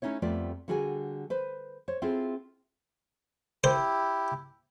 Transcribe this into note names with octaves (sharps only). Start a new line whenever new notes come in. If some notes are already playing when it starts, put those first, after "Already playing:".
A3 C#4 D#4 E4 C#5
F2 G3 A3 B3 F4 D5
D3 G3 F#4 G#4 A#4 G#5
B4 C5
C5 C#5
C4 E4 F4 G#4 A4
E4 G4 C5